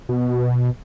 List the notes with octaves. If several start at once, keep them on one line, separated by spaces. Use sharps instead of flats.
B2